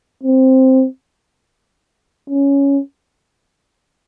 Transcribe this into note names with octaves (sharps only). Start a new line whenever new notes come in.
C4
C#4